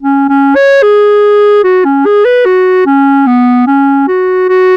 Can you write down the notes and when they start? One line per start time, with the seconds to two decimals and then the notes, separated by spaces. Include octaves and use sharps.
0.02 C#4
0.29 C#4
0.55 C#5
0.83 G#4
1.64 F#4
1.85 C#4
2.05 G#4
2.25 B4
2.45 F#4
2.86 C#4
3.27 B3
3.67 C#4
4.08 F#4
4.49 F#4